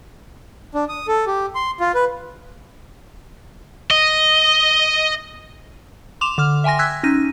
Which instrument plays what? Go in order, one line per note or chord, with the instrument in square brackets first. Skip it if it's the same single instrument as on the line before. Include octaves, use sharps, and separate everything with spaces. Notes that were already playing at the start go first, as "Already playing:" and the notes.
[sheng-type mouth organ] D4
D#6
A4
G4
C6
F4
B4
[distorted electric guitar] D#5
[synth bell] C6 D6 E7 F7
D3 D6 F6
E5 G5 G#5 C6 A#6
E6 F#6 G#6 B6
C#4 D#4 A#6 D#7